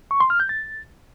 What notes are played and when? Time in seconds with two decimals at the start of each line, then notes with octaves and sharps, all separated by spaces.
0.11 C#6
0.20 C6
0.30 F6
0.40 G6
0.49 A6